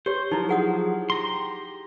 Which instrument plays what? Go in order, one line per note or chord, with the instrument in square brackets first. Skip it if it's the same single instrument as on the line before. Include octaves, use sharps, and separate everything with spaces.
[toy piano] G4 C#5 [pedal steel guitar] C5
[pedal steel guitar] F3 F#3 [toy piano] D#4 E4
[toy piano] G#4 F#5 D#6
[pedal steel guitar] G4 A#5 C6